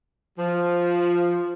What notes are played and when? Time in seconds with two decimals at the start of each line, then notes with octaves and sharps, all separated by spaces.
0.38 F3